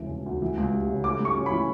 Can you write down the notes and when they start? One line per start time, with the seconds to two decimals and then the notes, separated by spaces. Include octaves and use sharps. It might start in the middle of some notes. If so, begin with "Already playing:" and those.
Already playing: E1 C#3 E3
0.10 E1
0.26 D2
0.42 E3
0.57 C#2
0.73 G3
0.89 C#3
1.04 A3 D6
1.20 G2 C#6
1.37 C#4
1.46 B5
1.51 E3